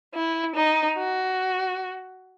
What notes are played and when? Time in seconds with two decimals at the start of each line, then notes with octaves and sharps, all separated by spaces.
0.14 E4
0.56 D#4
0.98 F#4